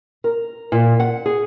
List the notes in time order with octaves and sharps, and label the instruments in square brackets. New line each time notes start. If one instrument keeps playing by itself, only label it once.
[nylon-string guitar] A#4
A#2
F#5
G#4